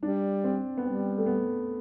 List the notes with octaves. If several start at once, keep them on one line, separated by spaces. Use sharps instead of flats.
G3 D4
C4
B3
G3 C4
A3
B3